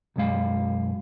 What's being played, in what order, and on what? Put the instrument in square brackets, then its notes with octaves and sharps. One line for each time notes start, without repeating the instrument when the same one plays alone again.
[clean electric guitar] B1 F#2 G#3 F5